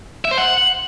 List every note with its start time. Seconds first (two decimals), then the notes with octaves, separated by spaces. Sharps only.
0.25 E5
0.31 C5
0.38 F#5